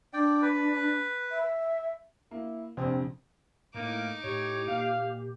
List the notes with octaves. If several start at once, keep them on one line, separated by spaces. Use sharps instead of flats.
D4 D5 G5
B4
E5
A#3 E4
A#1 F2 C3 C4
A2 A#3 D#4 D6
A2 G4 C#5
A#2 F5